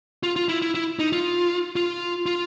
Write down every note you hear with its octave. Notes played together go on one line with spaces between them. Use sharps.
F4
F4
E4
E4
E4
D#4
F4
F4
F4